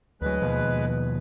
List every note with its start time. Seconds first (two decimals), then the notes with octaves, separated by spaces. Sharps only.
0.22 D2 F#3 G#3 B4
0.42 D#2 B2 F3